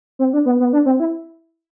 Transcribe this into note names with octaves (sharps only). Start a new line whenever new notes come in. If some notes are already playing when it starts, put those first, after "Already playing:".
C4
D4
B3
B3
D4
C4
E4